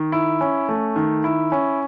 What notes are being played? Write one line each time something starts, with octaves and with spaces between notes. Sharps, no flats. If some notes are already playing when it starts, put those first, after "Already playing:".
Already playing: D#3
E4
C#4
A3
D#3
E4
C#4